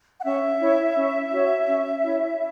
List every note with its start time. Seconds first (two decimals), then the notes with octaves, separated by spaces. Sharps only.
0.20 F#5
0.25 C#4 E5
0.60 E4 C#5
0.96 C#4
1.31 F#4 C#5
1.67 C#4
2.02 E4 C#5